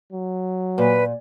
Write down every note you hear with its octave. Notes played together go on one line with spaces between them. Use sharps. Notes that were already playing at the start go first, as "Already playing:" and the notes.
F#3
A#2 B4